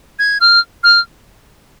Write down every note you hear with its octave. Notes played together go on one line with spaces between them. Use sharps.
G#6
F6
F6